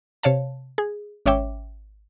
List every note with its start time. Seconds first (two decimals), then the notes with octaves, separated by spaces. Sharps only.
0.23 C3 C#5 F5 A5
0.78 G#4
1.26 G#1 C#4 C#5 E5 G5 D6